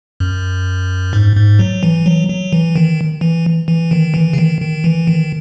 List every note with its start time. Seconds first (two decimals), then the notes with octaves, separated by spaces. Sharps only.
0.20 F#2
1.13 G#2
1.36 G#2
1.59 F#3
1.83 E3
2.06 F#3
2.29 F#3
2.52 E3
2.76 D#3
3.21 E3
3.68 E3
3.91 D#3
4.14 E3
4.33 C#3
4.38 D#3
4.61 D#3
4.84 E3
5.07 D#3